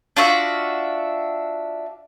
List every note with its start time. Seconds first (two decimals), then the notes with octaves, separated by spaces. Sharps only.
0.17 D4 F4 F#4 E5